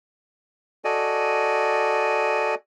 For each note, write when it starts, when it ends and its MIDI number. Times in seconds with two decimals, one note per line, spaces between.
0.85 2.55 66
0.85 2.55 69
0.85 2.55 74
0.85 2.55 75
0.85 2.55 80